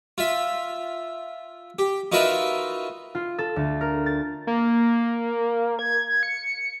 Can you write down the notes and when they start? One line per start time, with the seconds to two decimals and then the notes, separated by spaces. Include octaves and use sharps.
0.18 F4 E5
1.79 G4
2.12 D#4 F4 F#4 A#4 B4 E5
3.15 F4
3.38 A4
3.56 D2
3.81 A#4
4.06 A6
4.47 A#3
5.79 G#6
6.23 C#7